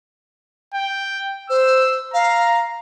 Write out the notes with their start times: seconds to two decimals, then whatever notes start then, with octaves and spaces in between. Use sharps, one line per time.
0.74 G5
1.50 C5 E6
2.14 F5 A#5